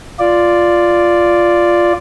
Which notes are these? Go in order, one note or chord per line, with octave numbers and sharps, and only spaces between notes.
F4 D5